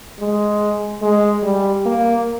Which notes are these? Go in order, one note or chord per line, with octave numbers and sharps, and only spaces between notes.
G#3
G#3
G3
A#3